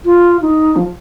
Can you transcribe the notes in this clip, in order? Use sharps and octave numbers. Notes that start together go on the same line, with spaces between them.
F4
D#4
F3